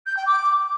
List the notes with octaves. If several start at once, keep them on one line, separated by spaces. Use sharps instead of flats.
G6
G5
D6